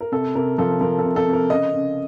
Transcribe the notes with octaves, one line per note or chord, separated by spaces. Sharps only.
A#4
C3 A4
C3 A#4
F3 A4
F3 A#4
A4
C3
A4
C3
A#4
C#3 D#5
C#3